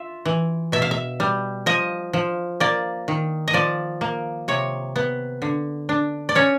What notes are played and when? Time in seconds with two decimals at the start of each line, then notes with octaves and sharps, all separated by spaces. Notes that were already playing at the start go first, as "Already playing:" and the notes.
Already playing: F4 E5
0.25 E3
0.72 B2 E5
0.82 F5
0.91 E5
1.20 G3
1.66 F3 D#5
2.13 F3
2.60 A#3 D5
3.08 D#3
3.48 D#5
3.53 F3 D5
4.01 A#3
4.48 C3 C#5
4.96 B3
5.42 D3
5.89 D4
6.29 D5
6.35 C#4 C#5